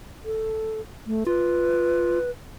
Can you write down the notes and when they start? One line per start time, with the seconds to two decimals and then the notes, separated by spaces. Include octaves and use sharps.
0.25 A4
1.07 A3
1.27 F4 B4